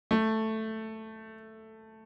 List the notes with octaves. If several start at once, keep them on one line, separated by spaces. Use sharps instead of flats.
A3